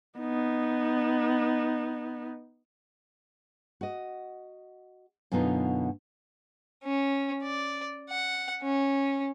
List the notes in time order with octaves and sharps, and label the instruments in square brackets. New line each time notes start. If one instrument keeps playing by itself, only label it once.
[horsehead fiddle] B3 D#4
[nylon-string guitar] F#4 D#5
F#2 B2 D3 B3 D#4 F4
[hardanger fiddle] C#4
D5
F#5
C#4